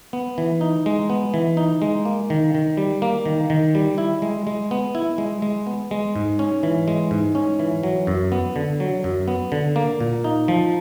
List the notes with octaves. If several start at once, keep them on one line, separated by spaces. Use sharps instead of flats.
B3
E3
D#4
G#3
B3
E3
D#4
G#3
A#3
D#3
D#3
G3
A#3
D#3
D#3
G3
E4
G#3
G#3
B3
E4
G#3
G#3
B3
G#3
G#2
C#4
E3
G#3
G#2
C#4
E3
F#3
F#2
B3
D3
F#3
F#2
B3
D3
A#3
A#2
D#4
F3